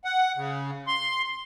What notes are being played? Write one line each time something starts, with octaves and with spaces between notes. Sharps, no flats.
F#5
C#3
C6